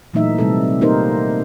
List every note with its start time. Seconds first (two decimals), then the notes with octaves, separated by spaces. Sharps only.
0.14 A#2 E3 F#3 A3 D#4 E5
0.38 C3 G3 A3 C4 A4
0.81 A#3 D#4 G4 A#4 C5